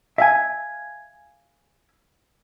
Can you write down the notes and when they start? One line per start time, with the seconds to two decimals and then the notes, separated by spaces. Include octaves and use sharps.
0.18 E5 F5 G#5